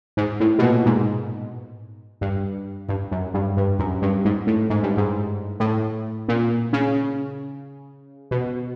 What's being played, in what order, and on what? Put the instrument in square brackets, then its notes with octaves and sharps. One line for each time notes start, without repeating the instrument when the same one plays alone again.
[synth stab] G#2
A2
B2
A#2
G#2
G2
G2
F#2
G2
G2
F#2
G2
G#2
A2
G#2
G2
G#2
A2
A#2
C#3
B2